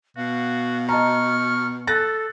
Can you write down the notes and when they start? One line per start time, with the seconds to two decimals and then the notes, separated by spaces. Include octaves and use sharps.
0.17 B2 F#4 F5
0.89 D#5 A5 A#5 C#6 F6
1.87 A4 F#6 A6 A#6